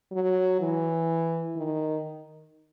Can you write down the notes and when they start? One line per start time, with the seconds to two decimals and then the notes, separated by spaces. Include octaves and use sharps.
0.12 F#3
0.60 E3
1.57 D#3